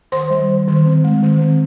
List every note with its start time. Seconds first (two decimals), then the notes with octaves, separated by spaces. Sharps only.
0.12 D#3 C5 C6
0.30 G3
0.49 D#3
0.68 D#3
0.86 C4
1.04 G#3
1.22 D#3
1.41 C4